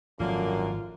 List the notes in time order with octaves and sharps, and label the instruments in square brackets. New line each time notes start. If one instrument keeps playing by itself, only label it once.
[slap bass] G#1 F3 F#3 [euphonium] F#2 [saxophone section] D3 A#3 [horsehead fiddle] F4